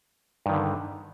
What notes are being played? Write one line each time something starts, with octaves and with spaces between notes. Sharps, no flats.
G2 D3 D#3